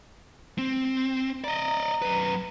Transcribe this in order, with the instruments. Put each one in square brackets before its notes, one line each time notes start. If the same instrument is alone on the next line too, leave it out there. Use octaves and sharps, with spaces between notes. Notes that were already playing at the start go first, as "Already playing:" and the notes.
[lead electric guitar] C4
[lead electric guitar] D5 D#5 [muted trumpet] A#5
[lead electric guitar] F#2 B4